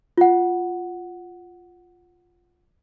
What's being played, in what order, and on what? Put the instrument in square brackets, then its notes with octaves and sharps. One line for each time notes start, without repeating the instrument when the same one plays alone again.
[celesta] F4 F#5